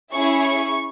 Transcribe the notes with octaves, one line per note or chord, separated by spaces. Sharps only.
C#4 E4 G#4 C#6
C#6